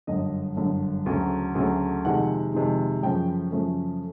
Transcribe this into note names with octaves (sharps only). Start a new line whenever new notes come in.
G1 F#2 D3 D#5
G1 F#2 D3
D2 C#3 F#3 A3
D2 C#3 F#3 A3
F2 C3 D#3 G#3 F#5
F2 C3 D#3 G#3
F#2 C#3 F3 A3 G5
F#2 C#3 F3 A3